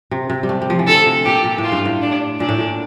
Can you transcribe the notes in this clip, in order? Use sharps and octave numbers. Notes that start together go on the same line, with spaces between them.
C3
C3
G3
A3
G3
F3
E3
D3 A4
C3
A#2 G4
A#2
A2
F4
G2
A2
D4
A#2 D4
A2
A#2